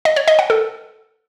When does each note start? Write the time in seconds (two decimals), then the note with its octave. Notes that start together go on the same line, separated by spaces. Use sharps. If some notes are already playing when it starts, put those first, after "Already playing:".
0.05 D#5
0.16 C#5
0.28 D#5
0.39 F#5
0.50 A4